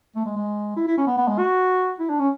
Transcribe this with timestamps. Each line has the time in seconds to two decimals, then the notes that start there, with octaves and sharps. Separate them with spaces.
0.16 A3
0.26 G#3
0.36 G#3
0.76 E4
0.87 E4
0.98 C#4
1.07 B3
1.18 B3
1.28 G#3
1.39 F#4
2.00 E4
2.10 D4
2.19 C#4